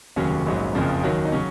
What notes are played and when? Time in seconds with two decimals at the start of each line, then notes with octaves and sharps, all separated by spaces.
0.16 F1 D#2 C#3 F#3 C#4
0.46 A#1 G#2 F#3
0.75 F#1 F2 C#3 F3
1.04 D#2 D#3 F#3
1.25 D#4
1.32 C#3 F#3 C#4